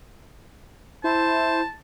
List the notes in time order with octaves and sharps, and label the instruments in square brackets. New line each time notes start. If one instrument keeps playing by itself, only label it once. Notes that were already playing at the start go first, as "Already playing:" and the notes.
[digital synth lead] E4 [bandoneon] C5 [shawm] A5